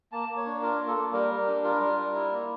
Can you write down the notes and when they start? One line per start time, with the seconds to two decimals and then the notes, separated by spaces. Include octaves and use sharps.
0.12 A#3 A5
0.29 A#3
0.37 C#5
0.46 D4
0.62 F4 A#4
0.79 A#3
0.87 A4
0.96 A#3
1.13 G3 A#4
1.30 G3
1.47 D4
1.64 F4 A#4
1.80 G3
1.98 G3
2.15 E4
2.32 A#3